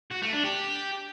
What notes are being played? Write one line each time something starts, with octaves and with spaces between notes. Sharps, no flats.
F#4
A3
D4
G4